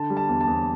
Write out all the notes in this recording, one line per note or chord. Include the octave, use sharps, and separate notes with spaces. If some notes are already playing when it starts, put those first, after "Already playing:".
Already playing: D3 A5
G3
A5
E2
A5
E2